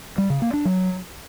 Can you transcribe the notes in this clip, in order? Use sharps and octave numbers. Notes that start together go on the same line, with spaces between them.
G3
C#3
A#3
D4
F#3